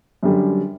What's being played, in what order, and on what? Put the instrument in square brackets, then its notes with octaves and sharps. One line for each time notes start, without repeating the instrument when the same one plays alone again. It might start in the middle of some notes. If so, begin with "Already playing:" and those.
[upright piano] F#2 D3 G3